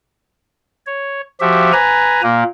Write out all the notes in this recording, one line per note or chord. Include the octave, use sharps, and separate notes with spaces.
C#5
F3 F#4 G4 E5
B4 G#5 A#5
A#2 A#3